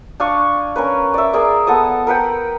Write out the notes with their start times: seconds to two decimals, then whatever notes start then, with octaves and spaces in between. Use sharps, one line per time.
0.20 D4 F5 G#5 C#6
0.76 C#4 A#4 B4
1.14 D5 E5
1.33 G#4 A#4 D5
1.67 B3 A4 A5 D#6
2.07 A#4 B4 F#5 G5